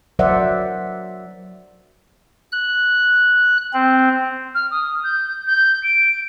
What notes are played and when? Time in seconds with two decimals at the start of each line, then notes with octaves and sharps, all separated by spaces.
0.19 F#3 A#4 C5 D5 E5 F#5
2.52 F#6
3.74 C4
4.55 F6
4.71 D#6
5.03 G6
5.47 G6
5.84 D7